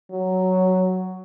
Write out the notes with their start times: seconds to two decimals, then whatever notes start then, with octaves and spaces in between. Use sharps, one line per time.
0.11 F#3